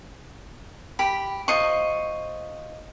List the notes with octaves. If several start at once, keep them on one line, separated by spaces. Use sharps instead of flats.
G4 B5
F4 C5 D#5 C#6